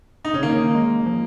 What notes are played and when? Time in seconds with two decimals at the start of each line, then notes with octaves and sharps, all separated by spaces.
0.25 D#4
0.34 C#3 C#4
0.43 D#3 A#3
0.75 G#3
1.06 F3